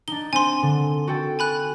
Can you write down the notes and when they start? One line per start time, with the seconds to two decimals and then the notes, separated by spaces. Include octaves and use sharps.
0.08 D4 D#4 G7
0.33 C4 G#5 C6
0.62 D3
1.07 F#4 A4 G5
1.39 G#5 B5 F#6